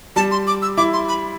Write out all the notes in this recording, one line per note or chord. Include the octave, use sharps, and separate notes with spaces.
G3 A5
C6
D6
E6
E4 D6
C6
B5